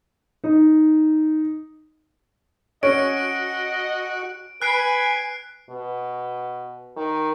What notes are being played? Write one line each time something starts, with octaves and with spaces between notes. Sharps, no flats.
D#4
C#4 F#4 D#5 D7
B4 G#5 F#6 C7 D7
B2
D#3